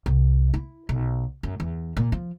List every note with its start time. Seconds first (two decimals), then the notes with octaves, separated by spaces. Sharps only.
0.06 C2
0.54 E4
0.89 B1
1.43 F#2
1.60 E2
1.97 A#2
2.12 F3